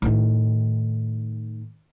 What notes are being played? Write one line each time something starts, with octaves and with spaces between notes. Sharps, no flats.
A2 D#3